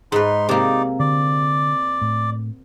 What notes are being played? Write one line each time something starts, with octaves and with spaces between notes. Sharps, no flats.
G#2 D#4 B4 C6
C3 A#3 D#4 D5
D3 D5
A2